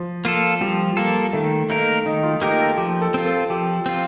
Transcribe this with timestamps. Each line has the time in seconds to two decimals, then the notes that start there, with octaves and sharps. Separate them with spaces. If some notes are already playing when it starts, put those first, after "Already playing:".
Already playing: F3
0.25 A#3 F4 A4
0.61 F3 G3
0.97 A#3 F4 A4
1.33 D#3 A3
1.70 A3 A#3 D#4 A#4
2.06 D#3 D#4
2.23 F4
2.42 A#3 D#4 G4 A#4
2.60 A4
2.77 F3 G4
3.01 A4
3.14 C4 F4
3.25 A4
3.50 F3 G4
3.86 C4 F4